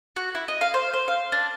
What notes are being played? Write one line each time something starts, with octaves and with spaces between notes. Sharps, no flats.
F#4
E4
D#5
F5
C5
C5
F5
D4